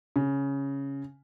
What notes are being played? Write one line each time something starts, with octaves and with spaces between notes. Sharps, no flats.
C#3